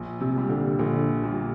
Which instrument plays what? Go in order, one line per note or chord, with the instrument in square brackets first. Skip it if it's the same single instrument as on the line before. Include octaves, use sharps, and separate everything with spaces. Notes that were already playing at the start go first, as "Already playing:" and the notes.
Already playing: [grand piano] A#1
[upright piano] C3
[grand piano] A#2 G3
[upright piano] D3
[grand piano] A#1 [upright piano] D3
[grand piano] A#2 G3